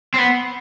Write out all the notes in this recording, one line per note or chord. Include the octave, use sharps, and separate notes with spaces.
C4
B3